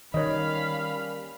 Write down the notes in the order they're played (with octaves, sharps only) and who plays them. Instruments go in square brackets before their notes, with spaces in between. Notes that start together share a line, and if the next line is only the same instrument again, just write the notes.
[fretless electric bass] D#3 [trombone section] G3 A#3 C#4 [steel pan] C#5 D#5 [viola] F5 B5